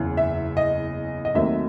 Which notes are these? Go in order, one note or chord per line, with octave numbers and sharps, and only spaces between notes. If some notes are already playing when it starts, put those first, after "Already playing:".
Already playing: F#1 E2 C#3
E5
D#5
D#5
D#2 D#3 F#3 A3 C4 E5